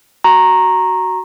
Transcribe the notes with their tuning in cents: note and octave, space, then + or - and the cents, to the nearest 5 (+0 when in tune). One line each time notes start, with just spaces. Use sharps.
F#4 +5 A#5 +0 C#6 -35